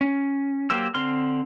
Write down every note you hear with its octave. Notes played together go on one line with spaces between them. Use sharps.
C#4
F#3 A#3 G4 C5 E6
D3 C4 C6 F6